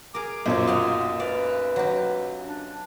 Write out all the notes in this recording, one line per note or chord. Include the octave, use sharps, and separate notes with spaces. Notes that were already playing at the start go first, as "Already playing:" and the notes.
G#4 A#4 D6
B1 F#2 A#2 C5 C#5
F5 F#5 C6 D#6
B4 D5 F5
F#3 G4
D4